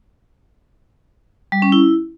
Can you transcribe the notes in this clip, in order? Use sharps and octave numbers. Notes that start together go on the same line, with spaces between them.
G3
C#4
E4